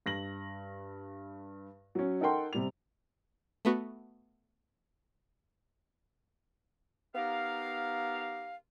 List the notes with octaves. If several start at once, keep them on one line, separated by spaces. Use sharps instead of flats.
G2 A#6 F#7
F#3 C#4
D#4 A4 A#4 F#5 G5 C6
C3 G3 F7
A3 B3 F#4
B3 D#4 G4 A#4 F5